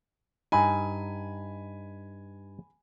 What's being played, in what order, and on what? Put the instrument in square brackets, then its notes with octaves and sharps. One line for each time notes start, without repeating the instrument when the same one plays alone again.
[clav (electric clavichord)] G2 D#4 [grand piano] G#5 B5